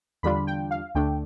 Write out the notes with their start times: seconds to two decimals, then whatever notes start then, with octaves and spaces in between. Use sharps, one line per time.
0.23 E2 D3 G3 D4 F4 B5
0.47 G5
0.71 F5
0.95 D2 D3 A3 D4 G5